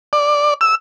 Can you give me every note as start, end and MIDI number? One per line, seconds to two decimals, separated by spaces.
0.13 0.54 74
0.61 0.75 88